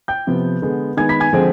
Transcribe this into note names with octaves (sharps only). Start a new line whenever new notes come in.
G5 G6
C3 F3 B3
D3 G#3 B3
D#3 G#3 B3 G#5 G#6
B5 B6
G#5 G#6
D3 F3 G#3 C4